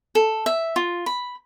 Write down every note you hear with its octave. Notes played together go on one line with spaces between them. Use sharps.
A4
E5
F4
B5